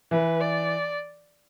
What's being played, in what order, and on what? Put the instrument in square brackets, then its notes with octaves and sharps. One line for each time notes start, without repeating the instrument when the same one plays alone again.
[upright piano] E3 [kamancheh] B4
[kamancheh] D5